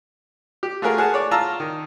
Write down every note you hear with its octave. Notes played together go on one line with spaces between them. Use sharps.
G4
A3 F4 F#4 G#4 A#4
G#4 F#5 A5
C#5 D5
F4 A5 A#5 E6 F6
D#3